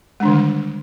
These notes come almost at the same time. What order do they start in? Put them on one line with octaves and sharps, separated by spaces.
G#3 D4 D#3 D3 G3